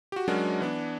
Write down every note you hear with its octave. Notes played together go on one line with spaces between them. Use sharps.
F#4 G4
F#3 G#3 C#4 D4 F#4 A#4
E3 B3 D4